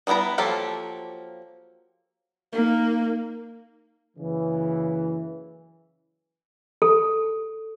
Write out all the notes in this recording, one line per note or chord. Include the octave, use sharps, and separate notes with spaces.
D#3 G3 B3 E4 A#5
F3 F#3 A#3 G4 A4
A#3 D#4
F#1 C#3 E3
A4